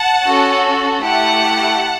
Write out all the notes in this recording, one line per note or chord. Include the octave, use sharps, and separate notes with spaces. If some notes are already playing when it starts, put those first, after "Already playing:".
Already playing: F#5 A5
C#4 F#4 A4
A3 E4 G4 F#5 A5